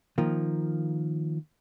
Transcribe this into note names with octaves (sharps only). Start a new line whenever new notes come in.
D#3 F3 A#3